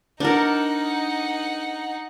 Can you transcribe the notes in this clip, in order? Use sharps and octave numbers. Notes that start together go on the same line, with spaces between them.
D4 D#4 A#4 F#5